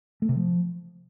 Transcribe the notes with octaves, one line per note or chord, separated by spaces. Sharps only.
A3
C3
F3